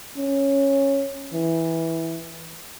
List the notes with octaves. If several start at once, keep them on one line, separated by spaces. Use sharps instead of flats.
C#4
E3